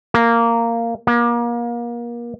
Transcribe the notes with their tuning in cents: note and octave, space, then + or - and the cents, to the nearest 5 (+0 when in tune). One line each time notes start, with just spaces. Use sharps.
A#3 -10
A#3 +30